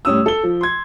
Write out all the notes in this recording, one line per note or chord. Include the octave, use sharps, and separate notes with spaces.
A2 G3 C#4 D#6 E6
A4 G7
F3
C6 G#6